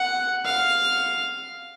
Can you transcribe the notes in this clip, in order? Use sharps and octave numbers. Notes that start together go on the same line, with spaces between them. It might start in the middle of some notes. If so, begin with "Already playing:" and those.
Already playing: F#5
F5